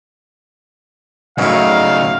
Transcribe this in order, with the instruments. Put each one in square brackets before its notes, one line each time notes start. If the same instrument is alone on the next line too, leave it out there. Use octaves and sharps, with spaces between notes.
[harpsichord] F#2 A2 [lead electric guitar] C#3 D#4 [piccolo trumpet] F5